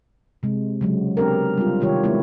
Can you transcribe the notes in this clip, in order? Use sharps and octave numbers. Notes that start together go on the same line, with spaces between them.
C3 G#3
C#3 F#3 G#3
B3 C4 D4 G4 A4 A#4
G3 C4 F4
C3 D#3 F4 G4 C#5
G#3 A#3 B3 E4